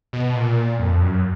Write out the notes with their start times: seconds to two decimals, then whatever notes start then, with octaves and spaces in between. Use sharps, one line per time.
0.13 B2
0.36 A#2
0.79 F2
1.01 F#2